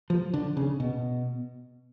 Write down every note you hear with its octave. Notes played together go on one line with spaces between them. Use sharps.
F3
D3
C#3
B2